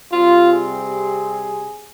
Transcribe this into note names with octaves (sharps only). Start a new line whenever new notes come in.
C3 G3 C4 F4
G#4